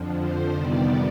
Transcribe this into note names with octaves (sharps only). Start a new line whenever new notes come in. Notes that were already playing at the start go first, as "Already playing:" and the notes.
Already playing: F2 D3 F3
C5
F2 C3 D#3 G3 B3 D5